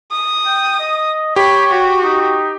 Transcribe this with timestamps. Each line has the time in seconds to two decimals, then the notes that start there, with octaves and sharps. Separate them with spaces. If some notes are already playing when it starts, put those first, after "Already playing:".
0.12 D#6
0.46 G5
0.80 D#5
1.36 G4 C#5 B5
1.70 F#4
2.04 D#4